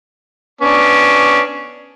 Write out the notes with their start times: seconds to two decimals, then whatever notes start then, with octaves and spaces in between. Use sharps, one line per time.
0.61 B3 C#4 D4